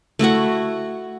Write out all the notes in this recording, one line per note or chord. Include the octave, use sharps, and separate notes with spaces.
A3 E4 F#4 F#5